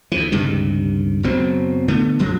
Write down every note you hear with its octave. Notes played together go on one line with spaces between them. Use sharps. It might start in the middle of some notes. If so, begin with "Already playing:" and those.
D2 E3
C#2 G2 C3 D#3
F#1 B2 F#3 C4
D3 A3 B3
E1 A#1 F#2 F3